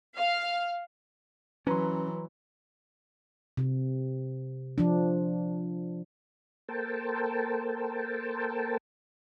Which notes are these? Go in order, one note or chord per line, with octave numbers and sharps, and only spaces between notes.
F5
E3 F#3 C#4 B4 A#5 C6
C3
F3 D4
A#3 A4 A#4 C5 G5 A5